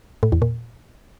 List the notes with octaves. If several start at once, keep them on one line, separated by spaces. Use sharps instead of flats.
A2
E2
A#2